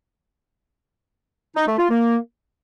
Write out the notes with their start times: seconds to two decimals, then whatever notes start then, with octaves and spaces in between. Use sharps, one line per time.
1.56 D#4
1.67 A3
1.78 F4
1.90 A#3